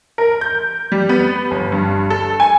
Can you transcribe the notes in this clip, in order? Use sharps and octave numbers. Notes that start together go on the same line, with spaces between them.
A#4
G6
G3
B3
G1
G2
A4
G#5